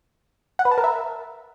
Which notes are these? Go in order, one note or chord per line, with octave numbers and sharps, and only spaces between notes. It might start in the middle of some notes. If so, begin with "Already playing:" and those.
F#5
B4
A5
A#4
E5